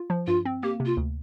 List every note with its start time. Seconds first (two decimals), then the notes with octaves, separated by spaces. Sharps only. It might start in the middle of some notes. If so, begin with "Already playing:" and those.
Already playing: F4
0.10 F3
0.27 G2 F4
0.45 C4
0.63 A#3 G4
0.80 C3
0.85 F4
0.97 D2